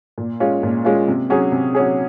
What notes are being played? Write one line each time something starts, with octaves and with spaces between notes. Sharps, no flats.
A#2
G#3 C#4 F4
A#2
G#3 C#4 F4
C3
F#3 C#4 G#4
C3
F#3 C#4 G#4